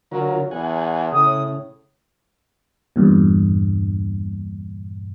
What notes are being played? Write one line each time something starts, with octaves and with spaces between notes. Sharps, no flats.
D3 F#3 F4 A#4
E2 F#5 G#5
A2 C#3 D#6
E2 G2 A#2